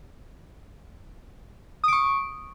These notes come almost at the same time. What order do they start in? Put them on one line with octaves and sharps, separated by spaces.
D#6 D7 C#6